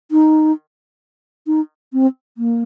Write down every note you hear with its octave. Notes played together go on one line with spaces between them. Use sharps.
D#4
D#4
C4
A#3